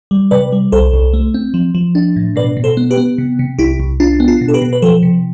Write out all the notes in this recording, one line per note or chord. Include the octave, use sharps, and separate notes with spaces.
G3
C3 B4 D5
G3
C2 A4 C5
C2
A3
C4
F3
F3
D4
A2
B2 B4 D5
B2
A4 C5
B3
G4 B4
B3
C3
C3
C2 E4 G4
C2
D4 F4
B3
F4
B2
A4
G4 B4
B2
B4
F3 A4 C5
C3